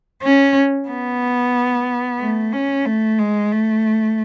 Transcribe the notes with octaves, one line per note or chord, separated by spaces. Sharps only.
C#4
B3
A3
C#4
A3
G#3
A3